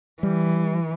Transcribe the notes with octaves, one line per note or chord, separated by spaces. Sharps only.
E3 G3